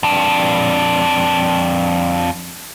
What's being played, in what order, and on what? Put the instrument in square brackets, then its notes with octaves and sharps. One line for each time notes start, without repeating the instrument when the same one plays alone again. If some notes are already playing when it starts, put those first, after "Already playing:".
[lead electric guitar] F2 D4